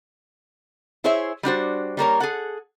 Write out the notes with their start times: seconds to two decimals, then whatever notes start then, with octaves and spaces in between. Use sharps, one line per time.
1.04 E4 G#4 C5 C#5 E5
1.43 G3 D4 F#4 C5
1.97 G3 A#3 A#4 C#5
2.20 G#4 A4 F#5